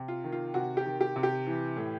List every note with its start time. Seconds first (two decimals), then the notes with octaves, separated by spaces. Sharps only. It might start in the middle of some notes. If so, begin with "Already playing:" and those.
Already playing: C3
0.08 F4
0.24 D#3
0.32 F4
0.54 C3 F#4
0.77 G4
0.86 D#3
1.01 G4
1.16 C3
1.23 G4
1.47 E3
1.76 A2